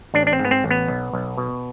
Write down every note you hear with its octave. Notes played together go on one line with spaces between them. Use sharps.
A1 D4
D4
C4
G#2
B3
C4
A1
B3
B1
B1
B2